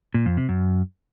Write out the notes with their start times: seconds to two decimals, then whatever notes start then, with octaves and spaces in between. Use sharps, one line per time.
0.14 A#2
0.26 F2
0.37 C3
0.49 F#2